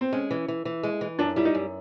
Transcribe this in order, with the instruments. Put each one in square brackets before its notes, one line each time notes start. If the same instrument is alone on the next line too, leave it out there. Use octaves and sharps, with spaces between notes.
[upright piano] C4
[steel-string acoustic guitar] G#3 [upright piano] C#4
[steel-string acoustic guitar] E3
E3
E3
G#3
E3
[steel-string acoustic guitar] F#2 [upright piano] D4
[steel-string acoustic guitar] G3 [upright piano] E4
[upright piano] D#4
[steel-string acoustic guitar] F#2